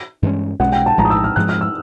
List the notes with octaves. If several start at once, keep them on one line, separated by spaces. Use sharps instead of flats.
G2 E3 G#3 C#4
B1 B2 G#3 C#4 F#5
G5
A5
A#1 A2 F3 G#3 A#5
D#6
E6
F6
G#2 F3 G#3 F#6
F6
E6